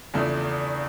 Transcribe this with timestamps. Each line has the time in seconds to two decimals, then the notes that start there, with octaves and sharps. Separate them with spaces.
0.14 E2 C#3 F3 A3 D4